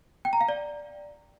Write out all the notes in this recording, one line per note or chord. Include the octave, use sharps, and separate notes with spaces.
G5
A#5
F5
D5